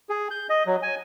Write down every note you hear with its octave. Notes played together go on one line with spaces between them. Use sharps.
G#4
G6
D#5
F#3
G#5